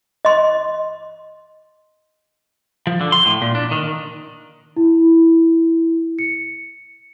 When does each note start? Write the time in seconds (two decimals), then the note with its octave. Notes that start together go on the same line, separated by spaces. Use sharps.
0.25 D#5 C6
2.87 F3
3.01 D3
3.12 C6
3.26 A2
3.42 A#2
3.55 D4
3.71 D#3
4.76 E4
6.19 C#7